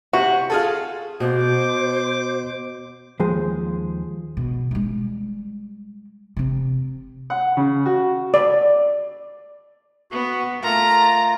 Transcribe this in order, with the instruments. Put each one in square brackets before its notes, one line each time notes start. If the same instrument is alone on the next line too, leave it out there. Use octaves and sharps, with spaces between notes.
[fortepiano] C3 [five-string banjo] F#4
[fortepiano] F4 G#4 A4
[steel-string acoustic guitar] B2 [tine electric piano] F#4 [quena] C5 [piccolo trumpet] D6
[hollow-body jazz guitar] D#2 F3 G#3 G#4 C5
[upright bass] B2
G3 G#3
C3 C4
[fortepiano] F#5
C#3
F#4
[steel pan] D5
[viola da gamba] B3 [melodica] F#4
[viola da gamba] A3 [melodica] F4 A#4 [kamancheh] A#5